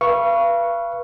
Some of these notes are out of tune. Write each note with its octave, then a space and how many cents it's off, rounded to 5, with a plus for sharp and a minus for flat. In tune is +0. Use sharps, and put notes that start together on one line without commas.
B4 -25 F5 -35 C#6 +0